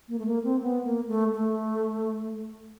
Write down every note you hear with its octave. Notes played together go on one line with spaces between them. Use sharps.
A#3
A3
A#3
C4
B3
A#3
A3
A3